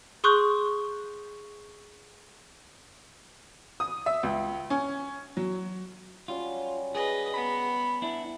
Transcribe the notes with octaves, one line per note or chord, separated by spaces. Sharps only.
G#4 C6 C#6 D#6 F#6 G6
D#6
E5
C#2
C#4
F#3
F#3 G3 C#4 F4
G#4 B4 D#5
B3 A#5 B5
D4 E4